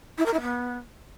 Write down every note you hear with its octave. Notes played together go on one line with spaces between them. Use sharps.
E4
A#4
E4
B3